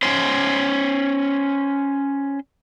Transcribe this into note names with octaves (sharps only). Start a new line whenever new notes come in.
C#4 C5